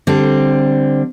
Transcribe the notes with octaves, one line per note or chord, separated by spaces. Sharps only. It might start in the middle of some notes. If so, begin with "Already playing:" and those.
D3 G3 C4